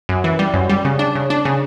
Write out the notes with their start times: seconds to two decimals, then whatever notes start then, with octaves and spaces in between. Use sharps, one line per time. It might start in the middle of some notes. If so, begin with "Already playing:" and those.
0.09 F#2
0.24 E3
0.39 G3
0.54 F#2
0.69 G3
0.85 C#3
0.99 D4
1.15 C#3
1.30 D4
1.45 C#3